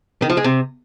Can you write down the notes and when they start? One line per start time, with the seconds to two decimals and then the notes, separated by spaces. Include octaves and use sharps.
0.22 D#3
0.30 F3
0.37 G#3
0.44 C3